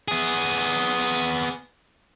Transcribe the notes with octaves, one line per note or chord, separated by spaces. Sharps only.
B3 G#4